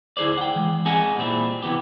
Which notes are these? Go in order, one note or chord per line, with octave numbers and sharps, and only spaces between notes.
D2 E4 G#4 C5 D5
F#5 G5
E3 G#3
C4 G#4 D#5 F#5 G#5
A#2 G3 C4 E4
C3 E3 B3 G4